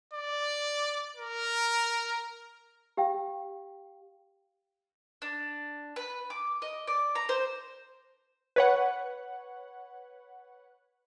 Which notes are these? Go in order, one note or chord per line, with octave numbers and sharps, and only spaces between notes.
D5
A#4
G4 F5 G5
D4
B4
D6
D#5
D5
A#5
C5
B4 C#5 F#5